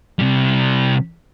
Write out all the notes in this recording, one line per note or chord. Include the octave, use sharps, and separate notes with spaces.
C3 G3